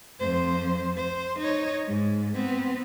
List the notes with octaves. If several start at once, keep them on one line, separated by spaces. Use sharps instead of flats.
F2 C5
C5
D#4 C#5
G#2
B3 C4